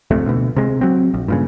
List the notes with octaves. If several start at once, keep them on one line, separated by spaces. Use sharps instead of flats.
D1 F2 C3 A3
D2 B2
C3 G#3
F#3 C4
A#1
G2 A#2 C#3